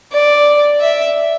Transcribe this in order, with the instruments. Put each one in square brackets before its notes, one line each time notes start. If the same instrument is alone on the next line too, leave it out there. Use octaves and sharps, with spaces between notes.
[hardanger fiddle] D5
E5